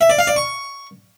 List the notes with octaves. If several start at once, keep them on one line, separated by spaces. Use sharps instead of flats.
E5
D5
F5
D5
C#6